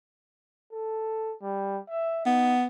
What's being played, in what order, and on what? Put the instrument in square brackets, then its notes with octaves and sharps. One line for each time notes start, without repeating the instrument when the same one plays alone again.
[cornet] A4
G3
E5
[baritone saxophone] B3 [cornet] D#4